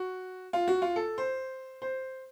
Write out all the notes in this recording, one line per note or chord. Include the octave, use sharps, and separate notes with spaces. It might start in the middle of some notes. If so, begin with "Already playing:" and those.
Already playing: F#4
F4
F#4
F4
A4
C5
C5